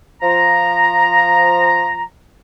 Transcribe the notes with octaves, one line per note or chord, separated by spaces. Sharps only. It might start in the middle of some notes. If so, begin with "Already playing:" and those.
F3 A#5